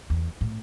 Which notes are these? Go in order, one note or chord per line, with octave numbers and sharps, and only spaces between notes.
E2
A2